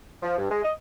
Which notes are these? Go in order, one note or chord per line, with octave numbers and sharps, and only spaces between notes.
F3
G2
G#3
D#5